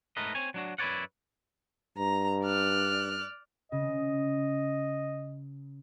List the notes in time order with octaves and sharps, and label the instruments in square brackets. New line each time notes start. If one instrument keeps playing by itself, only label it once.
[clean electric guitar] G#2 A3 A#4 B4 D#5
C4 C#5 G#5
F#3 D4 F#4
F#2 E4 B4 C#5 D5 F#5
[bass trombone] G2 [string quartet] A#5
[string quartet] D5 F6 F#6
[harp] C#3 [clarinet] D#5